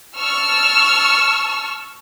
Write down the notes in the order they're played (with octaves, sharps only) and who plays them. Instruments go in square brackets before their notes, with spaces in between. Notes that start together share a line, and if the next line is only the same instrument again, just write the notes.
[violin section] A5 C#6 E6 F6